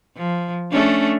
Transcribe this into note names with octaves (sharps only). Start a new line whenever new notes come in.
F3
A3 C#4 D4